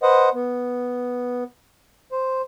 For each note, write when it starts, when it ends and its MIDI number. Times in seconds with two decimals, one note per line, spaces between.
0.03 0.29 71
0.03 0.29 72
0.03 0.29 75
0.03 0.29 78
0.34 1.44 59
2.12 2.42 72